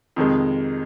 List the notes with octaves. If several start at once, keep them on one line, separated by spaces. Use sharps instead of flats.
F2 C3 D#3 G#3